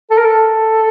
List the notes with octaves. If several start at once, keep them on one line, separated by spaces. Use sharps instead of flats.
A4
A#4
A4